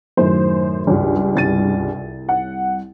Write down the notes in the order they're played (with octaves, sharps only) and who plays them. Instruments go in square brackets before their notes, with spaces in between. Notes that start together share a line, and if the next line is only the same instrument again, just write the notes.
[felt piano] F#2 A2 D#3 [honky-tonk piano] C5
[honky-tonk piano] C#2 G2
[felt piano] C2 A6 D#7
[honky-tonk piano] F#5